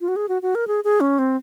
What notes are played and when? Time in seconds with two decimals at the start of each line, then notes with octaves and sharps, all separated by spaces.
0.01 F4
0.08 F#4
0.16 G#4
0.29 F#4
0.42 F#4
0.55 A#4
0.68 G#4
0.84 G#4
1.01 C#4
1.19 C4